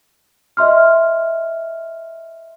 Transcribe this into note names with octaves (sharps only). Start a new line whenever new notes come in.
D#5 E5 C6 F6